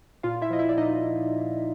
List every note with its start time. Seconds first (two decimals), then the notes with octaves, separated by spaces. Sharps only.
0.23 A#2 F4 F5
0.42 E4 E5
0.50 F3 D#5
0.59 E4 E5
0.69 D5
0.77 A#2 D#4 D#5